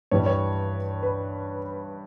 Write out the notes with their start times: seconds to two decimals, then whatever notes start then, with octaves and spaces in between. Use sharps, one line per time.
0.11 G2 E3 G3 C#5
0.26 C#5
1.03 B4